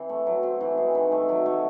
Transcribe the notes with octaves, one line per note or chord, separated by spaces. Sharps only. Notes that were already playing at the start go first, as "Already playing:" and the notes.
Already playing: E3 C4
A3
F#3
C4
E3
G#3
D#3
A3
F#3
A3